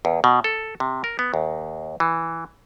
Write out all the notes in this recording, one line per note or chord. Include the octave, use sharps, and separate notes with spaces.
E2
B2
A4
C3
A#4
B3
D#2
E3